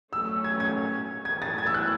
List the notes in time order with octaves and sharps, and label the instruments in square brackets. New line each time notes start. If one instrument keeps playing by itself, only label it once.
[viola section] F#3 A3 C#4 [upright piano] E6
[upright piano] G#6
G#6
G#6
[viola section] F#3 A3 E4 [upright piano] A6
[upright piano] G#6
E6
F#6